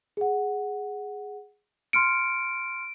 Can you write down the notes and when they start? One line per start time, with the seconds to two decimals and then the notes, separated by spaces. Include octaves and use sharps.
0.17 G#4 F#5
1.93 C6 F6 C#7 D7